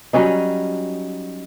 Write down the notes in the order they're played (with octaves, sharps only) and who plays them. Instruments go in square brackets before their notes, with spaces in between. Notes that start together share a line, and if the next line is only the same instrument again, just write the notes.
[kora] F#3 G3 C#4 D#4